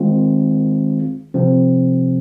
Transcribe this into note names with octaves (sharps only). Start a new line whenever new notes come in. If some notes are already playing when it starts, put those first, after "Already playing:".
Already playing: D#3 G#3 C4 F4
C3 F3 C4